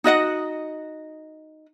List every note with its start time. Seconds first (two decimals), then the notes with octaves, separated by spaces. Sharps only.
0.04 D#4 F#4 D#5 F#5